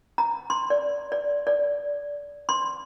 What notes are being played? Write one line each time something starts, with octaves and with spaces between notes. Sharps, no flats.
A#5
C6
D5
D5
D5
C6